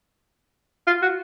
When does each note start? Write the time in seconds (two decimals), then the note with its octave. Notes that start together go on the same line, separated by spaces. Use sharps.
0.87 F4
1.02 F#4